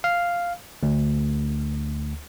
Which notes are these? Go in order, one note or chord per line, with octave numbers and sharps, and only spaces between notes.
F5
D2